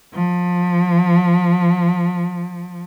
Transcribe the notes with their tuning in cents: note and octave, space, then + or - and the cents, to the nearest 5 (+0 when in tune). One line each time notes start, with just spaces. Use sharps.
F3 +20